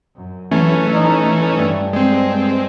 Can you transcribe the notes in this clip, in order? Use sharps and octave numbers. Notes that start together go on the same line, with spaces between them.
F#2
E3 F#3 A3 C#4
D#4
G2
G#3 C4